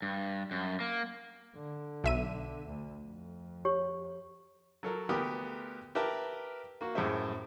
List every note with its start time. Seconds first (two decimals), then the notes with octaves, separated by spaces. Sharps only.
0.02 G2
0.51 F#2
0.80 A#3
1.56 D3
2.04 B1 E5 D#7
2.67 D2
3.05 F2
3.65 G4 C#5
4.83 F#3 A4 A#4
5.09 D2 B3 G4 A#4 B5 D#6
5.95 G4 A#4 B4 E5 A5 A#5
6.81 A#3 F#4
6.95 F#2 A2 G#3 G4 C5 E5